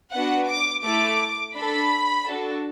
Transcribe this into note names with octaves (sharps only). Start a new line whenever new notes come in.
B3 D4 F#4 F#5
D6
A3 E4 A4 D6
D4 A4 B5
D4 F#4 A4